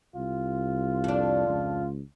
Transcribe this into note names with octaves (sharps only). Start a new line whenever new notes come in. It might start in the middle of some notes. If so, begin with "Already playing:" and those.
C2 F4
F2 D4
C#2